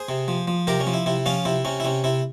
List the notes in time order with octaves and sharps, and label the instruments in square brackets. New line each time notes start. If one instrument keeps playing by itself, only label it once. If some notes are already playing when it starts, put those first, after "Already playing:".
Already playing: [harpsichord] G#4 C5
C3
F3
F3
C3 G4 A#4
C#4
F3
E4
C3 E4
F3 C#4 F4
C3 E4
C3 C#4
E4
C3 C#4
C3 E4